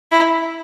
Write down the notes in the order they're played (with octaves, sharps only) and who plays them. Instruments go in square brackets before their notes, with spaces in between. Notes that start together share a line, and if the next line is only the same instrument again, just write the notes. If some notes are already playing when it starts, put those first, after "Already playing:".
[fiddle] E4